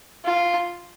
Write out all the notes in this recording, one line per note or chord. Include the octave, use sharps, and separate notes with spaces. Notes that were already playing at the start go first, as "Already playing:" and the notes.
F4